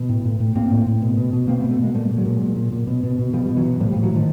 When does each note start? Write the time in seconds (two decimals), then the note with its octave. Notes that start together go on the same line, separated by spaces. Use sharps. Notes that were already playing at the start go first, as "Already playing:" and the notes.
Already playing: B2
0.09 A2
0.25 A2
0.40 A2
0.55 A2 A#3 C4
0.71 A2
0.86 A2
1.02 B2
1.17 B2
1.33 B2
1.48 B2 A#3 C4
1.60 A3 B3
1.64 B2
1.71 A3 B3
1.79 B2 G#3 A#3
1.95 A#2 G3 A3
2.11 A#2
2.17 F#3 G#3
2.26 A#2
2.41 A#2
2.56 A#2
2.72 A#2
2.87 B2
3.04 B2
3.19 B2
3.33 B2 F3 G3
3.50 B2
3.56 E3 F#3
3.65 B2
3.80 A2 F3 G3
3.91 F3 G3
3.96 A2
4.03 E3 F#3
4.11 A2 D#3 F3